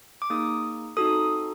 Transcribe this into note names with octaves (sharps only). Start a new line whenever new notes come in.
D6
A#3 D#4 G#4 D#6
C4 D#4 F#4 A4 D#6